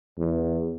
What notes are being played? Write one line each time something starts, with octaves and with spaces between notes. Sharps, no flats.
E2